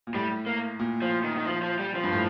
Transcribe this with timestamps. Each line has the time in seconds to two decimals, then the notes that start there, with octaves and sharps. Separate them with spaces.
0.07 A#2
0.14 A2 G3
0.47 A#3
0.79 A#2
1.02 F3
1.24 D#3
1.37 D#3
1.46 F3
1.62 F3
1.79 G3
1.95 F3
2.04 G2
2.12 A2